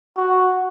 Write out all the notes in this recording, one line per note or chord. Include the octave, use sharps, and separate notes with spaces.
F#4